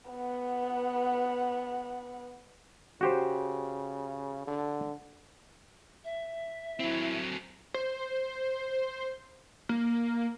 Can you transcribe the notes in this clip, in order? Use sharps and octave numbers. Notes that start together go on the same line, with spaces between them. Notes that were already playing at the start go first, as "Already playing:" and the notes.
B3 F#5
C#3 F#4 G4 C5
D3
E5
F#3 C4 E4
C5
A#3